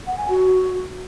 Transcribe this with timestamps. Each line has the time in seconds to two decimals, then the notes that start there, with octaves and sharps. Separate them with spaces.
0.07 F#5
0.18 G#5
0.29 F#4